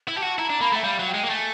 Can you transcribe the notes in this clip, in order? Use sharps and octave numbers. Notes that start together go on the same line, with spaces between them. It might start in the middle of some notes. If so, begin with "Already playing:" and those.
E4
G4 A5
F#4
E4 A#5
D4
A#3 B5
A3 E5
G3 F5
F#3
G5
G#3
A#3
A3 G#5